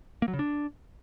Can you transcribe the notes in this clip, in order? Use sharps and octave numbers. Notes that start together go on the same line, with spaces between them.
A#3
F#3
C#3
D4